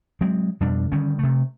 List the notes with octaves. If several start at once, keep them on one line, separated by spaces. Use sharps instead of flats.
F#3 G#3 C4
F2 B2 G3 D4
D3 D#3 G3 C#4
C3 A3